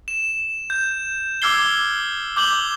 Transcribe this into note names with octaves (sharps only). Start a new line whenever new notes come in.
E7
G6
D6 E6 F6 G#6 C7 G7
D6 G6 F#7 G7